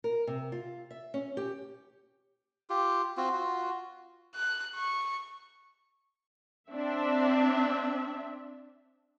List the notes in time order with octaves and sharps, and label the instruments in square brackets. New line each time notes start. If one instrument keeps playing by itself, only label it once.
[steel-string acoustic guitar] A#4
C3
F4
E5
C#4
G4
[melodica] F4 G4
C4 F4 F#4
F4 F#4
[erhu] F#6
C#6
[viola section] C4 D4 E5